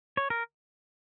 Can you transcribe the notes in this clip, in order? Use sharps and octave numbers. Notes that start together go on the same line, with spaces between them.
C#5
A#4